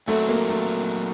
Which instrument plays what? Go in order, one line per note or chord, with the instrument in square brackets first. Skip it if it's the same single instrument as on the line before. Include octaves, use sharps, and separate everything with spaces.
[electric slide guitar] A#2 F#3 C4 F#4 [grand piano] A3
[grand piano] A#3
A3